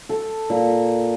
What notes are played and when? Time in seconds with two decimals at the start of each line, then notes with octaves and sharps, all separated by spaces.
0.09 A4
0.50 A#2